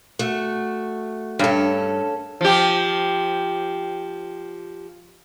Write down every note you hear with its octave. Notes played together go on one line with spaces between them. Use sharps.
A3 F#4
G2 C#4 A4
F3 G4